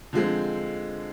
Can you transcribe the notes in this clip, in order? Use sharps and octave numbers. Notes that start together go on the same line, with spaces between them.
D3 F3 G#3 C4